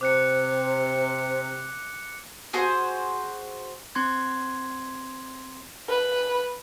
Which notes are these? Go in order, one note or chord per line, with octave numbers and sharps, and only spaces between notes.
C3 C5 D6 F#6 C#7
F#4 G#4 C5
C4 C6 G#6
B4